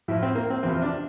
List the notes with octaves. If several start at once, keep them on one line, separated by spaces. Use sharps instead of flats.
A2 F3 E4
C4
A#3
C4
E2 C3 F3 C4
D4